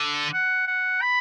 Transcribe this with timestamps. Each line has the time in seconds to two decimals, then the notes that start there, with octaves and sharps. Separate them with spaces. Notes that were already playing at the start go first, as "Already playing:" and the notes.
Already playing: D3
0.33 F#5
0.68 F#5
1.02 B5